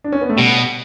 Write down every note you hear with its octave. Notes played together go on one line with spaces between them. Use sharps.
D4
C#4
B3
A3
B2 G3